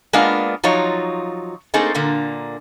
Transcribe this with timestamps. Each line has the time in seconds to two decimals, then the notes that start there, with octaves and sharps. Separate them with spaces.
0.13 G#3 A#3 B3 D4 F4 F5
0.64 F3 F#3 D#4 F4 C#5
1.74 A3 A#3 C4 D#4 G#4 A4
1.95 A#2 D3 A#3